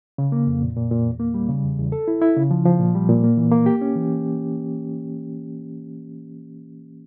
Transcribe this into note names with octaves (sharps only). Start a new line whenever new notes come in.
C#3
A#3
F2
A#2
A#2
A#2
E2
A#3
G3
C#3
E2
E2
A4
E4
E4
C#3
F3
F3
A#2
G3
A#2
A#3
E3
A#3
G4
C#4
E3